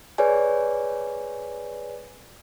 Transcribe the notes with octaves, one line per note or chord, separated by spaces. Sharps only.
G#4 B4 C#5 D5 G#5